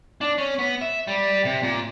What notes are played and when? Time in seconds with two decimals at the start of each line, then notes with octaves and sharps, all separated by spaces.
0.21 D4
0.38 C#4
0.59 B3
0.81 E5
1.07 G3
1.45 C3
1.63 A#2